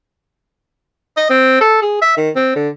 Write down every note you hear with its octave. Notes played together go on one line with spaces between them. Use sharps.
D#5
C4
A4
G#4
E5
D#3
C4
D3